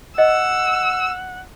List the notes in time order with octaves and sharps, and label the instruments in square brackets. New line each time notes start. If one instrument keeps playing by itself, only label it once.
[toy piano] D#5 [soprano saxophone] F#5 [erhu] E6